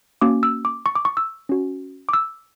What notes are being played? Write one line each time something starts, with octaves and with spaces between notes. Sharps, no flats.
A#3 C#4 F#4 D6
E6
D6
C#6
D6
C#6
E6
C#4 F#4
D6
E6